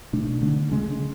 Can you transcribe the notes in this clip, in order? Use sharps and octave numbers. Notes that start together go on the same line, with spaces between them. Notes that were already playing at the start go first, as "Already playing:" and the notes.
B2 A3 D4
D3 A3 D4
C#3 G#3 C#4